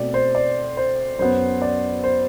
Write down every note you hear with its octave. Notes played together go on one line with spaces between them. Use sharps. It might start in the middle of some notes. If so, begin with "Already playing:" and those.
Already playing: B2 A3 C4 D5
C5
D5
C5
F#2 F#3 B3 C5
D5
C5